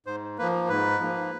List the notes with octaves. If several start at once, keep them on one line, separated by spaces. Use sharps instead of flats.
G#2 C5
F3 A#3 B4
G#2 B4
F3 A#3